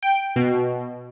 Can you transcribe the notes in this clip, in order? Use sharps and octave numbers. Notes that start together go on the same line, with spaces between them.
G5
B2